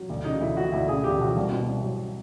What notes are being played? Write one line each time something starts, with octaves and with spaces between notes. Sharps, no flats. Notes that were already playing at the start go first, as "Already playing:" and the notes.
Already playing: F#3
D2
C#3 D#4
D2 E4
F3 F#4
D2 E4
C#3 G#4
D2 G4
F3 F#4
C2
B2
C2
F#3